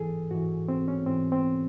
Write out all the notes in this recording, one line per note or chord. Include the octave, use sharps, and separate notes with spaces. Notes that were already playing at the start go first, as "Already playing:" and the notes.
Already playing: G#2 E3 G#4 A4
G#2 E3 F#4
C4
C#4
G#2 E3 C4
C4